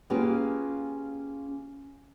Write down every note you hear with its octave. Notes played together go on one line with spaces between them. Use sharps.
A#3 C#4 F4 G4 G#4 B4